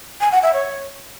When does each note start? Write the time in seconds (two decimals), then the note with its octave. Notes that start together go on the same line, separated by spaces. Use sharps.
0.21 G#5
0.32 F#5
0.43 E5
0.54 C#5